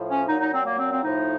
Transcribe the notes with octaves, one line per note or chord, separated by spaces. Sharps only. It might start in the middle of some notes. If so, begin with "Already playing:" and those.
Already playing: A2 F3
C#4
A#2 F#3 D#4
D#4
C4
A#3
C4
C4
A2 F3 D#4